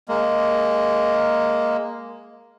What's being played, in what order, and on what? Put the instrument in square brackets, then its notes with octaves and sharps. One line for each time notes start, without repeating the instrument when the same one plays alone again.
[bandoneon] G#3 A#3